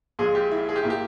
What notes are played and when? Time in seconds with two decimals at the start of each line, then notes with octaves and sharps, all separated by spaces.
0.19 A#1 A#2 G#3 G#4
0.35 G4
0.51 E4
0.69 G#4
0.76 G4
0.82 A#2 A#3 E4
0.90 G4